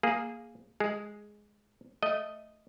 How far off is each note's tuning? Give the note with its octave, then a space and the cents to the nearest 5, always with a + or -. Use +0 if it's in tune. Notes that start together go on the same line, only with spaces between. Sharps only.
A#3 +0 G#4 +0
G#3 +0 G#4 +10
A3 +0 D#5 +0